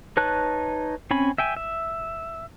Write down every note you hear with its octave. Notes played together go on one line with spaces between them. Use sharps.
D#4 B4 C#5 A5 F#6
C4 C#4 G#5 B5
E5 G5 G#5
E5